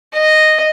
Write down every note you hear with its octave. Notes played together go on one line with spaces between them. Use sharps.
D#5